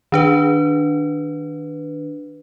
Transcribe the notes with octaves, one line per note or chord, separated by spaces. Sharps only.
D#3 D4 B4